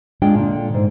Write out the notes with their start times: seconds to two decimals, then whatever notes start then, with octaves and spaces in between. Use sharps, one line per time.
0.22 G#3 D4 F4 G5
0.35 A#2 D3
0.74 G#2